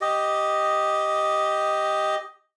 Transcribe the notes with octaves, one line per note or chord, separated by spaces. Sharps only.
G4 D#5